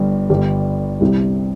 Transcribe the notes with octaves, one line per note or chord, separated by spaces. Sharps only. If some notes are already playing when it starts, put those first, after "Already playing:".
Already playing: G1 G2 G3
G1 G2 G3
C2 C3 G3